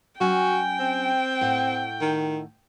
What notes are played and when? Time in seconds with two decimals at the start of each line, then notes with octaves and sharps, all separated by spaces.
0.21 F#3 C#4 F#4 G5 G#5
0.80 C4
1.41 A2 F#5
2.01 D#3